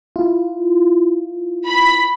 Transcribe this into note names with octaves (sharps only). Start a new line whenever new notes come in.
E4 F4
B5